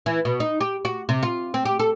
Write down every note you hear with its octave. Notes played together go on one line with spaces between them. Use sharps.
E3
B2
D#4
G4
F#4
C3
F4
C4
G4
A4